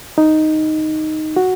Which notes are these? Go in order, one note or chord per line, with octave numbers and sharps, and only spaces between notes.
D#4
F#4